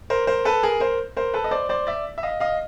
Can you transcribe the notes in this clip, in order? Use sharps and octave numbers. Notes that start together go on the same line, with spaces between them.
A#4 C5
A#4 C5
A4 B4
G#4 A#4
A#4 C5
A#4 C5
A4 B4
D#5
C5 D5
C5 D5
D5 E5
E5
D#5 F5
D#5 F5